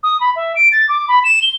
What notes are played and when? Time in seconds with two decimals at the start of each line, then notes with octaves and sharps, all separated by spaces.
0.03 D#6
0.21 B5
0.36 E5
0.56 D7
0.72 A6
0.89 D6
1.08 B5
1.24 E7
1.42 G7